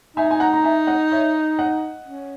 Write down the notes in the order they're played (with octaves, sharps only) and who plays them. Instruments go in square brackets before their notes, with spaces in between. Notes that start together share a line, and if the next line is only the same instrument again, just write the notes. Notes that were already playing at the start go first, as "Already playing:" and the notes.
[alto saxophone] D#4 [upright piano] E5 G#5
[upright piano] G#5
F#5 A#5
A#5
E5 G#5
D#5 F#5
C#5 E5
D#5 F#5
[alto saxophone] C#4